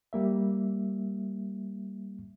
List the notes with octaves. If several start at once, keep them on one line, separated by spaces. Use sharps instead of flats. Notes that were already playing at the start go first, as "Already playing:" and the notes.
G3 A#3 E5